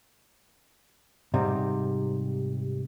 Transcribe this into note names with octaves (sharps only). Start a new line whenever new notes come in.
G#2 C3 G3